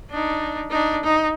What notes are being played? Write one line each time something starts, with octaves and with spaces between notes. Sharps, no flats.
D4 D#4
D4 D#4
D#4